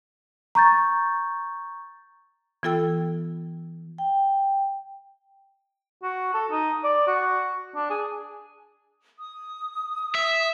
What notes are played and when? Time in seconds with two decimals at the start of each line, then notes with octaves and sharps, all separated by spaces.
0.55 A#5 C#6 G6 A6
2.63 E3 B3 F4 A4 G5 E6
3.98 G5
6.03 F#4
6.34 A4
6.51 D#4
6.84 D5
7.08 F#4
7.76 D4
7.90 G#4
9.19 D#6
10.15 E5